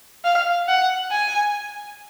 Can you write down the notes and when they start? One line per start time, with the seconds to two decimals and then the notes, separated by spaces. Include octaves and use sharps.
0.25 F5
0.68 F#5
1.12 G#5